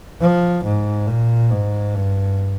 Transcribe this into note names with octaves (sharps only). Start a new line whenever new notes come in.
F3
G#2
A#2
G#2
G2